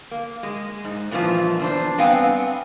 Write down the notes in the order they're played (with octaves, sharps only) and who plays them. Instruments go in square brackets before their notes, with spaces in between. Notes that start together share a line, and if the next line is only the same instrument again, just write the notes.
[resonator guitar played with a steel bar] A#3
G#3
G#2
G2 A#2 E3 F3
E2 D4 C5
G2 B3 C4 F5 G#5